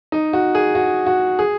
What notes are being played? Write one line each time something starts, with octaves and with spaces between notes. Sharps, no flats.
D#4
F#4
G#4
F#4
F#4
G#4